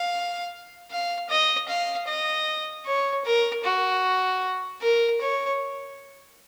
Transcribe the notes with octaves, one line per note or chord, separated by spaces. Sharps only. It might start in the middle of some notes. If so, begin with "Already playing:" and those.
Already playing: F5
F5
D#5
F5
D#5
C#5
A#4
F#4
A#4
C#5